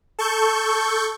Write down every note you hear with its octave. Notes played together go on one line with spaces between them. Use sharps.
A4 C#6 G6